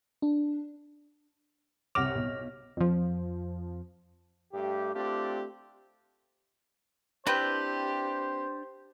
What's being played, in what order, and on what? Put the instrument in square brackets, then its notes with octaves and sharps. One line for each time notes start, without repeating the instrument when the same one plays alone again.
[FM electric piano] D4
[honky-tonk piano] C2 F#5 F7 [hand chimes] C#5 F6 A#6 [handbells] D6
[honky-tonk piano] B1
[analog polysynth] F2 F3
[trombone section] G2 A3 G4
A3 C4 D4 F4 G4
[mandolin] C4 E4 B4 [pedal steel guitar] D4 G5 [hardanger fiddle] G4 [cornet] C5